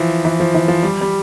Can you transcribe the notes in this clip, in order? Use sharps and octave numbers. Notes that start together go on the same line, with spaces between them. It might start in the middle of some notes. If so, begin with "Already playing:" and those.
Already playing: E3 F3
E3
F3
E3
F3
G3
G3